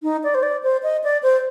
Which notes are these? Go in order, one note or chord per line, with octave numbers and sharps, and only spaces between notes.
D#4
D5
C5
D5
C5
D#5
D5
C5